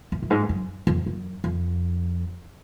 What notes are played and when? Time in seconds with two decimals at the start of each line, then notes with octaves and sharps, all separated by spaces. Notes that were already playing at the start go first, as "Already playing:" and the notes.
0.12 F#2
0.22 F#2
0.30 G#2
0.49 F#2
0.87 F2
1.06 F#2
1.44 F2